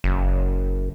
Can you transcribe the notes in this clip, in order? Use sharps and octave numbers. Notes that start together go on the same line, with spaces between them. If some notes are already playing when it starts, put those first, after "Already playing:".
F#1